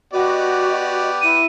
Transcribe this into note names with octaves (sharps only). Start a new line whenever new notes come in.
B3 F#4 G4 D5 D#5
E4 D#7